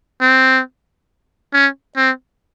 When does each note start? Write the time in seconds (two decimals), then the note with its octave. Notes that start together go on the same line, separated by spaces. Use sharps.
0.21 C4
1.53 C#4
1.97 C4